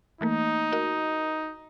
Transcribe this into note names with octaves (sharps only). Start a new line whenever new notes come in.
E3 A3 A#3 D#4
F#4 A#4 D#5